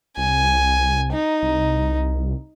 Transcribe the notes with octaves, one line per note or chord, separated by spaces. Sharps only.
C2 G#5
D#4
C2